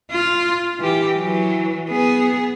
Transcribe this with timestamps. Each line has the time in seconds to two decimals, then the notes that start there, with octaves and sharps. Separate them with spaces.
0.11 F4
0.80 E3 G4
1.16 E3 F#3
1.89 B3 G#4